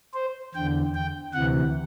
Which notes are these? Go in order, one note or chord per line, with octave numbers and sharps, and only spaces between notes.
C5
E2 D3 G5
G5
D2 C3 E3 F#5